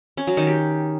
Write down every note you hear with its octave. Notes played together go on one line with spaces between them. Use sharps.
C#4
F#3
D#3
G4